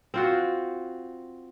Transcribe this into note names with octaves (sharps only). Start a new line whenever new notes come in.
C4 F4 F#4